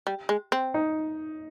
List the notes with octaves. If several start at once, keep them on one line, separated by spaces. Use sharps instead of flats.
G3
G#3
C4
D#4